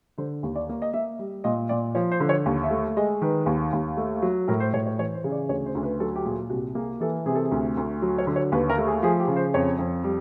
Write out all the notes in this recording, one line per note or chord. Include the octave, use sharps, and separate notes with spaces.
D3 C5
D#2
D5
A#3
D#5
A#3 E5
G3
A#2 D#5
A#2 D5
F3 C#5
C5
D3
C#5
D#2
E5
A3
G#3 D#5
D#3 B4
D#2
D#2
A3
F#3
A2 A#4
C5
A2 C#5
C#5
E3 C#5
C5
C#3
D5
D2 C#5
C5
D2
B4
F#3 A4
G4
A#2 G#4
C2 F#4
A#3 G#4
E3 A4
C3 G#4
A4
G#4
D2
D2
F#3
C#5
D3
C#5
D#2 B4
A#4
A3
G#4
F3 G#4
G4
C#3
C5
F2 C#5
F2
G3